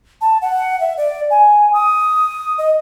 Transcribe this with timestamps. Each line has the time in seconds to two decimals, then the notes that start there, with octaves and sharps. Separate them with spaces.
0.21 A5
0.42 F#5
0.80 E5
0.97 D5
1.30 G#5
1.73 D#6
2.58 D#5